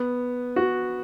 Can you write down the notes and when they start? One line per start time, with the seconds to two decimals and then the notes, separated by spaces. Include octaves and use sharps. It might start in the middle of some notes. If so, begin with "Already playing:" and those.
Already playing: B3
0.56 F#4